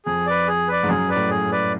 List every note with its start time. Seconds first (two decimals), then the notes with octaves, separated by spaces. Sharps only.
0.06 F2 G#4
0.26 B4 D5
0.48 G#4
0.68 B4 D5
0.83 G#2
0.89 F#2 G#4
1.09 B4 D5
1.16 A2
1.30 G#4
1.52 B4 D5